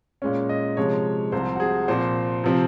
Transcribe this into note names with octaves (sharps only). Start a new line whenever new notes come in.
A#2 G#3 C#4
D#5
C3 F3 G#3 C#5
C2 C3 F3 C4 C5
F#4
G#4
A#2 F3 C4 C5
C3 F3 C4